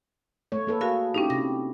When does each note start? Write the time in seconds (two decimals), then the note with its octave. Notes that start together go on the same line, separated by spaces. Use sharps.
0.52 A3 C#5
0.67 A#3 A4 B4
0.81 F#4 G#4 A#4 F5
1.14 C#4 D#4 E4 G4
1.30 C3 A#6